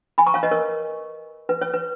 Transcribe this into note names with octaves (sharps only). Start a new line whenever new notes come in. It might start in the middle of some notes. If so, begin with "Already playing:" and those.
G#5 B5
A#5 C#6
C#5 F5
B4 D#5
A#4 C#5
B4
C#5
B4